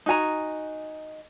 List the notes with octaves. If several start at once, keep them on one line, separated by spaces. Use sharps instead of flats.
D#4 F#4 G#5 A#5